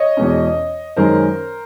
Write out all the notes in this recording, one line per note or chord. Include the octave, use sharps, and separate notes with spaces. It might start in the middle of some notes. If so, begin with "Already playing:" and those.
Already playing: C#5 D#5
E2 B2 G#3 C#4
F#2 D#3 G#3 C#4 A#4 C5